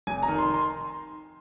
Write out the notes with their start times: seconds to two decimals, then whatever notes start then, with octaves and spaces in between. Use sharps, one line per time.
0.07 F1 G#5
0.23 A#5
0.28 D#3
0.38 C6
0.54 C6